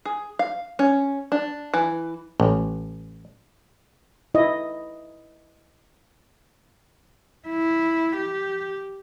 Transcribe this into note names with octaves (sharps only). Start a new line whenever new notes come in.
G#4
F5
C#4
D4
E3
A1
E4 D#5
E4
G4